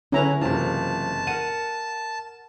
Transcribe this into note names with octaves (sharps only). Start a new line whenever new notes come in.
D3 C#4 E4 B4 A#5
F#1 F#2 C3 E3 F4 A5
A#4 F#5 D#7